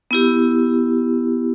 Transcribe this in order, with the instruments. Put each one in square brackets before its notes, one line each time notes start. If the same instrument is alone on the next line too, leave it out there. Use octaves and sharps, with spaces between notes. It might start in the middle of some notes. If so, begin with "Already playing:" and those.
[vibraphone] B3 E4 G4